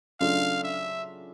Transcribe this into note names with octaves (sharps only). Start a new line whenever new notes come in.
C#3 F#3 A3 D4 F4 F5
E5